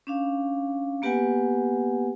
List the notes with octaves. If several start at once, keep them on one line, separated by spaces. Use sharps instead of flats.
C#4 D4 F5
A#3 B3 G4 B4 F#5 G#5